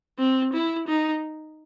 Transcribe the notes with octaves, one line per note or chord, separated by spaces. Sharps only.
C4
E4
D#4